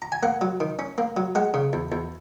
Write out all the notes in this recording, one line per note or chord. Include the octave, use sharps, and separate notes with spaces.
A#5
G#5
A#3 F#5
F#3
D#3
C#4
A#3
F#3
G#3 F#5
C#3
E2
E2